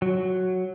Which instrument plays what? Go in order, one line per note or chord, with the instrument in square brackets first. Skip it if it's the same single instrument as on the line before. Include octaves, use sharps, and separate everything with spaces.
[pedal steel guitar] F#3